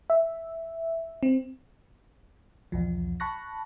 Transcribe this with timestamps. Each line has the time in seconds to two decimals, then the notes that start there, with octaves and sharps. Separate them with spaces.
0.10 E5
1.23 C4
2.72 B1 E2 F3
3.20 A5 B5 C#6 F#6 A#6